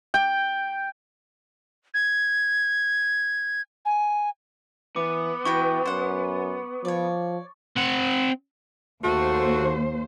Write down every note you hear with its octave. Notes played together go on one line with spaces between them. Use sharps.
G5
G#6
G#5
E3 B3 D6
E3 E4 F#4 G5 C#6
F#2 C5 F#5
F3 C#5 D5
C4 F#5
D#2 A3 F#4 C5